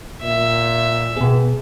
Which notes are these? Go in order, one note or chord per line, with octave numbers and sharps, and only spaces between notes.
A#2 E5
B2 B3 G#4